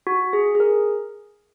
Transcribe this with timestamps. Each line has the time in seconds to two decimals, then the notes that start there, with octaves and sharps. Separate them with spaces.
0.07 F#4
0.33 G#4
0.55 G#4
0.60 A#4